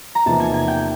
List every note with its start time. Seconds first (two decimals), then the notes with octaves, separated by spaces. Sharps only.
0.15 A#5
0.26 E2 C3 F3 A#3 D#4 A5
0.40 G#5
0.54 G#5
0.68 G5